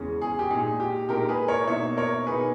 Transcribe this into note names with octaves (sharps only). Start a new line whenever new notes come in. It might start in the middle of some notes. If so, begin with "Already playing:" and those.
Already playing: E2 C#3 G#3 C#4
G#4
G4
A#2 G#3 D#4 G#4
G4
A#2 G#3 D#4 G4 A#4
G#4 B4
A#4 C#5
B2 A#3 D#4 C#5 E5
A#4 C#5
B2 A#3 D#4 G#4 B4